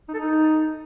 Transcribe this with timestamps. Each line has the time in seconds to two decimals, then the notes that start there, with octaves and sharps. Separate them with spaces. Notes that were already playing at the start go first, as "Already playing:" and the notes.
0.09 D#4
0.14 A4
0.19 D#4